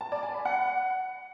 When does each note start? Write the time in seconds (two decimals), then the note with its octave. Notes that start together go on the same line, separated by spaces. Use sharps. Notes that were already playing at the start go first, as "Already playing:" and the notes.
0.01 A5
0.12 D5
0.23 G#5
0.34 B5
0.45 F#5